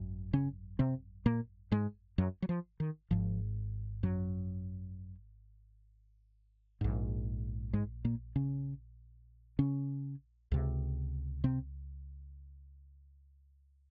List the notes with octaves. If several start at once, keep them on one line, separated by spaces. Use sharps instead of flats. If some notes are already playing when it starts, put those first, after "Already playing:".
Already playing: G#1 F#2
C#3 C#4
C3 C4
A#2 A#3
G#2 G#3
F#2 F#3
F#3
F3
D#3
G#1 G#2 F3
F#2 F#3
A#1 G#2
G#2 G#3
A#2 A#3
C#3 C#4
C#3 C#4
C#2 C3
C3 C4